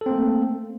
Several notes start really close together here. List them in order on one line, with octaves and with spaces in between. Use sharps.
A4 C4 A#3 A3